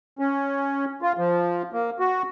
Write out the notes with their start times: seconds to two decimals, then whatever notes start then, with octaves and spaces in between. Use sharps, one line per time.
0.19 C#4
1.02 F4
1.18 F3
1.73 A#3
1.99 F#4